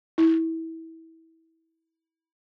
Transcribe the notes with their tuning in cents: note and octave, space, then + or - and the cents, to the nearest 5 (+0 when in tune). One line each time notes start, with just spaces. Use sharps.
E4 -20